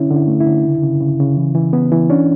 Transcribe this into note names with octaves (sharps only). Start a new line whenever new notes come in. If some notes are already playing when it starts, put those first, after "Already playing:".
Already playing: D3 C#4 E4
D3
E4
A3
E4
D3
C#3
C#3
C#3
C#3
E3
E3
B3
E3
C#4 D4